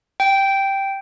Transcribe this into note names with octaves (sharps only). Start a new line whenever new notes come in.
G5